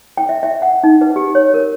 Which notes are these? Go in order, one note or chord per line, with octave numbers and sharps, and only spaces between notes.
G5
E5
E5
F#5
D#4
B4
G4
C#5
A#4